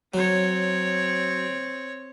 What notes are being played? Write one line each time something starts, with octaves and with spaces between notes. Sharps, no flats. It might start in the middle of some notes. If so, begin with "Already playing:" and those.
F#3 C4 C#5